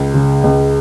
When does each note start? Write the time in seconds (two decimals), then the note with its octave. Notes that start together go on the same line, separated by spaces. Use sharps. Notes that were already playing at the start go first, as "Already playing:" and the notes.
Already playing: C#2
0.14 C#3
0.44 C#2